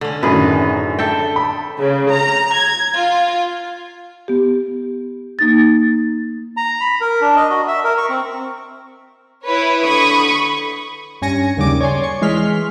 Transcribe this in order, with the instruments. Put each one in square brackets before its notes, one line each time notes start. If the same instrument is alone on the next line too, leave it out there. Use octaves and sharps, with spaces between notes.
[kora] D3 C#4
[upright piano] F#2 A2 D#3 [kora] G#4 B4
[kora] A4 E5 G5
[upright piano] B5
[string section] C#3
A#5
G#6
F4
[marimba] B3 G4
A#3 D#4 A6
[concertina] A#5
B5
A#4
D4
D#5
F#4
E5
A#4
C#6
C4
[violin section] E4 B4 C#5
[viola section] D3 B5 [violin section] C#6 D#6
[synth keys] G2 C#4 G#5 A#6 C#7
D#2 C#3 G3 D6
C#5 D5 G#5 C6
C#6
E3 G#3 C6 F6 B6